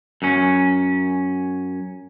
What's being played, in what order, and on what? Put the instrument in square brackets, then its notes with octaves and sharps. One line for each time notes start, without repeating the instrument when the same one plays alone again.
[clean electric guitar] F#2 C#4